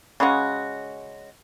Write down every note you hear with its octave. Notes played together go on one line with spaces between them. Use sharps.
C#3 G#3 C#4 F#4